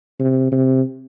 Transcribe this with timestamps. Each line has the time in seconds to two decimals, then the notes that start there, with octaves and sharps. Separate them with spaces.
0.20 C3
0.52 C3